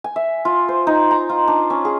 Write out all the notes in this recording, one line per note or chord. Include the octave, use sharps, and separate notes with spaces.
G#5
E5
F4
C5
D#4
A#5
F4
D4
C#4
G#4